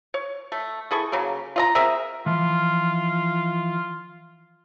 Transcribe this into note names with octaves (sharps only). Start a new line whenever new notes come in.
C#5
A3
E3 G#4 A4 C#6
C#3 F#3 A#3
F4 D#5 A#5
C4 G#4 A#4 E5
E3 F3 F4